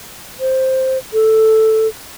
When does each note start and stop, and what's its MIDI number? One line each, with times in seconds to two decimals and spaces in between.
0.40 0.98 72
1.13 1.88 69